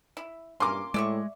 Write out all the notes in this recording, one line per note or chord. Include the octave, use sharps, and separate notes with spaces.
E4
G2 A#3 C#4 C6 D6
A2 G#3 D5 E5 C#6